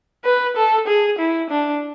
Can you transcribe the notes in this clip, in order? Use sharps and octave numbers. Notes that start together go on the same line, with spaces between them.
B4
A4
G#4
E4
D4